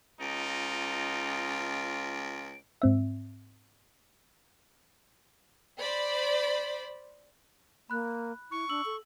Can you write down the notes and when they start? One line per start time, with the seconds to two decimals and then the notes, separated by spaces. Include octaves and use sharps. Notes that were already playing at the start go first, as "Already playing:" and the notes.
0.21 C#2 D#4 F4 D7
2.82 G#2 C4 E5
5.78 C5 D5 B5
7.90 A#3 B5 F#6
8.51 E4 C#6
8.69 D4 E6 F#7
8.85 A4